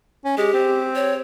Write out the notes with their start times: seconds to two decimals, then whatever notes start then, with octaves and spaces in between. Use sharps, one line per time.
0.25 C#4
0.37 G#3 G4
0.54 C4
0.95 C#5